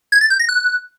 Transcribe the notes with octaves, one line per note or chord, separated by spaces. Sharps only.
G#6
A6
G6
A#6
F#6